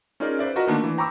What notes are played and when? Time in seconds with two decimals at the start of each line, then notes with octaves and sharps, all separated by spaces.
0.20 C#4 D#4 F4 G#4 A#4 D5
0.39 B4 C5 D5 E5
0.56 F4 F#4 A#4 B4 D#5 A#5
0.67 D3 D#3 A3 A#3 D4
0.84 E3
0.98 G5 A#5 B5 C#6 D6 E6